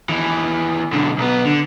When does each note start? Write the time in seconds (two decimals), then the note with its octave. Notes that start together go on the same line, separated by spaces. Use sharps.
0.09 D#2 E3
0.93 B1 D3
1.18 B1 B3
1.45 D3